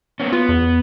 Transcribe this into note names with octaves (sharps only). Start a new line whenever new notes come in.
A#3 B3 C#4
B3 F4
E2